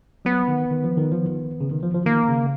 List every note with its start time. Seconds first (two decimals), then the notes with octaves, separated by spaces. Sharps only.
0.25 F#3 B3
0.48 D#3
0.71 D#3
0.84 F3
0.97 D#3
1.12 F3
1.25 D#3
1.61 C#3
1.71 D#3
1.83 F3
1.94 F3
2.06 D#3 A#3
2.28 C#3